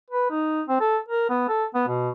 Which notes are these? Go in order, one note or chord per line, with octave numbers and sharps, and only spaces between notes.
B4
D#4
C4
A4
A#4
B3
A4
B3
B2